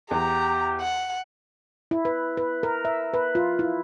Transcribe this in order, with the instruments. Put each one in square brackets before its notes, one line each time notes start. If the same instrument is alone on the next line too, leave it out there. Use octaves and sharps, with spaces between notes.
[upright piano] E2 [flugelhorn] G4 [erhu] A#5
[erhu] F#5
[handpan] E4
B4
B4
A#4
E5
B4
F4
E4